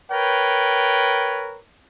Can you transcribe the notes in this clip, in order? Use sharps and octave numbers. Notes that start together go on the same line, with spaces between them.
A#4 B4 C#5 G5